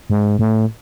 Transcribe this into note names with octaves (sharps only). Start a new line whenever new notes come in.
G#2
A2